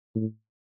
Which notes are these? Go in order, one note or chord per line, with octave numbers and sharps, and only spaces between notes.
A2